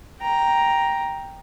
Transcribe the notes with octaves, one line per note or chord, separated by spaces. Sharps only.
G5 A#5